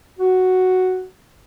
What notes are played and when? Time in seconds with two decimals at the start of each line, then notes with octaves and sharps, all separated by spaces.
0.19 F#4